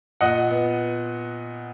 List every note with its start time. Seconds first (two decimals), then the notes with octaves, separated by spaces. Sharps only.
0.21 A#2 D#5 F#5
0.51 B3